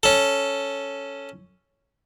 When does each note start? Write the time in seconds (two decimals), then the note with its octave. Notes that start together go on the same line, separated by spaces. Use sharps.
0.03 C#4 A4